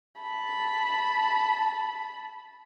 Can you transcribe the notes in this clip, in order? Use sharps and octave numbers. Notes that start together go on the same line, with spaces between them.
A5 B5